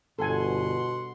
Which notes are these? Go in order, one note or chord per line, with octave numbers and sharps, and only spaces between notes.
G1 B2 A4 F#5 G#5 C6